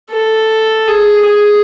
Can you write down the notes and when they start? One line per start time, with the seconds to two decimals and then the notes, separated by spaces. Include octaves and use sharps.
0.11 A4
0.88 G#4
1.26 G#4